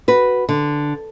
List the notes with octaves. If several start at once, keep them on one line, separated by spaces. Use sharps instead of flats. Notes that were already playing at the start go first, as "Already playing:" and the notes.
F#4 B4
D3